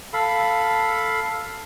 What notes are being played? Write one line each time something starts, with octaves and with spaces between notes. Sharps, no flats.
A4 F5 B5